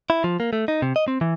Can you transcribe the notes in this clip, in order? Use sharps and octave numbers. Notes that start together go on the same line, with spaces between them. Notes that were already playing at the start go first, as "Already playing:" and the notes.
E4
F3
A#3
A3
D#4
C3
D#5
C4
E3